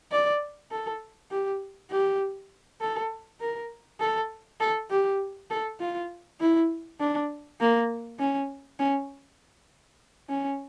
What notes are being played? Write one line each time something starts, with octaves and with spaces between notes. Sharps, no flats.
D5
A4
G4
G4
A4
A#4
A4
A4
G4
A4
F4
E4
D4
A#3
C#4
C#4
C#4